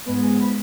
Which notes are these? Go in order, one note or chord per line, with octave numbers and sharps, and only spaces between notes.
G#2 G#3 B3 B4
G#5
B5